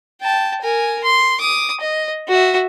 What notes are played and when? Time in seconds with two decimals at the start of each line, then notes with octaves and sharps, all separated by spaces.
0.21 G5 A5
0.62 A#4 G#5
1.04 C6
1.40 D6 D#6
1.80 D#5
2.28 F#4 E5